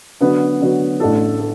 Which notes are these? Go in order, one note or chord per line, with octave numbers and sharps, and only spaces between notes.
D3 F#3 B3
D3 F#3 B3
A1 A2 A3 D4 A4
A4